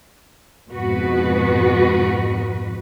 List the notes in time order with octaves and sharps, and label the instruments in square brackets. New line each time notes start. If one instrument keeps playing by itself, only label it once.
[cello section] F2 G#2 B2 F#4 B4